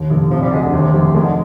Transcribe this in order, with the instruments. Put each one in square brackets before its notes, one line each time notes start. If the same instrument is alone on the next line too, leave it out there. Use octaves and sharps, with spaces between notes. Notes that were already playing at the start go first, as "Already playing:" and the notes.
Already playing: [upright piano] D#2
F1
[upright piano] C3 [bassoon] F3
[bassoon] G3
[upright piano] D2 [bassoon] G#3
[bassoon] D3
[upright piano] D#2 [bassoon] C3
[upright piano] F1 [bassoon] C3
[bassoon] D#3 [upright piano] G#3
[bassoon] D3